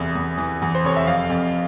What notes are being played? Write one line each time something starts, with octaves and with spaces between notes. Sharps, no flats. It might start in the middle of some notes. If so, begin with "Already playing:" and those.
Already playing: F1 E2 E5
E2
E3
E2
C5
F1 C#5
E5
F2 F5
F2